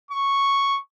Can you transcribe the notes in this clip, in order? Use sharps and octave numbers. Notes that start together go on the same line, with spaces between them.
C#6